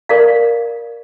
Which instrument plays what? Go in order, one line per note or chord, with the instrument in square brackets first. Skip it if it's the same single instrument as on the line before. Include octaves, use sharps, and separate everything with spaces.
[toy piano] A#4 D5 F5